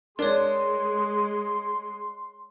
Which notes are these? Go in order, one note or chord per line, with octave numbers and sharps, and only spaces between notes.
G#3 D4 A#4 C#5 C6